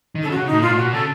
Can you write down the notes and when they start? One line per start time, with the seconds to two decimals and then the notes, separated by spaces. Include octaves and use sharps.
0.15 D#3
0.23 C#3 A4
0.31 F#4
0.36 C#3
0.46 D#4
0.53 A2
0.62 A#2 F4
0.71 A2
0.77 A#2 F#4
0.93 C#3 A4